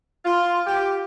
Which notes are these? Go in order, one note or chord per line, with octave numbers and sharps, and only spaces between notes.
F4
G4